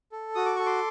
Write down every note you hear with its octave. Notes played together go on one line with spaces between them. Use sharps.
A4
F#4 D#6
D6
A4 C#6
C6 D6